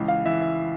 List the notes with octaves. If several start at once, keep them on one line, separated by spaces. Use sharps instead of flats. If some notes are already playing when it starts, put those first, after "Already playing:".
Already playing: C#2 E3
F5
E3 E5
E5